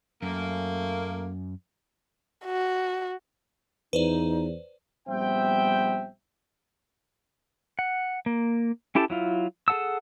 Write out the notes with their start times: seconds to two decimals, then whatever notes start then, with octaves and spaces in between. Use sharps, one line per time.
0.22 F#2 A3 A#3
2.45 F#4
3.93 E2 D#4 B4 C5 D5
5.08 A#1 G3 B3 C4 E5 G5
7.79 F#5
8.26 A#3
8.95 C#4 E4 G4 A4 A5
9.10 F#3 E4 F4
9.68 G#4 A4 F#5 A5 E6